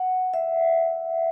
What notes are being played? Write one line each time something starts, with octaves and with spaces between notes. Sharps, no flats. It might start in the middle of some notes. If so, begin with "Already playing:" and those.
Already playing: F#5
E5